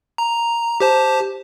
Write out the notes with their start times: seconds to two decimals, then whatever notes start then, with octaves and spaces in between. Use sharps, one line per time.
0.18 A#5
0.80 G4 C5 A5